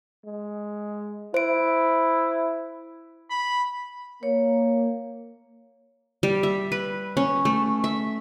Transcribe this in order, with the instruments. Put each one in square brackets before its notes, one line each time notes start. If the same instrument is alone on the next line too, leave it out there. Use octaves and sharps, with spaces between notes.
[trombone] G#3
[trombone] E4 [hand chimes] C5 D7
[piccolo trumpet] B5
[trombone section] A#3 [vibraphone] C#5
[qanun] G3
E5
B4
C#4
A3
E5